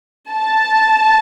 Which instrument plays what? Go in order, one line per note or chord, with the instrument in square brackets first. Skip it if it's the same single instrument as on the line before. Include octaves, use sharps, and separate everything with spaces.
[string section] A5